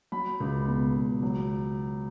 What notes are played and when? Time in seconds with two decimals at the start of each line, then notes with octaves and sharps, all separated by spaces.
0.12 F#3 B5
0.40 C#2
0.68 B2
0.94 C#2
1.23 F#3